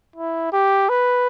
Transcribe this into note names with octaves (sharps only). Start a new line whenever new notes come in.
E4
G4
B4